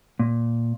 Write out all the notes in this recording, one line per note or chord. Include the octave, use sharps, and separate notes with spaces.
A#2